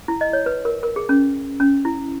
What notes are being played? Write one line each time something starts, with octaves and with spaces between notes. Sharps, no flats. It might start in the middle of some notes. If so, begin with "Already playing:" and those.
E4
D#5
C#5
B4
A#4
A#4
G#4
C#4
C#4
E4